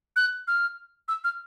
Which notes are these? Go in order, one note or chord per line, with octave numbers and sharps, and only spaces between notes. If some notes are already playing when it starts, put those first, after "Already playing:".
F#6
F6
E6
F6